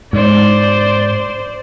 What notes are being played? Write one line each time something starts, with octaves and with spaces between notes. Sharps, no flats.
G#2 C5 D5